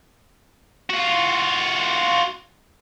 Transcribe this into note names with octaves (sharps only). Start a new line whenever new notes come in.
F4 F#4